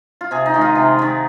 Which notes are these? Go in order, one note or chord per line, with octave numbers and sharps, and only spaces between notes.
F4
C3 G#4
D#4
D#3 G#3
F4
C3
D#3 G#3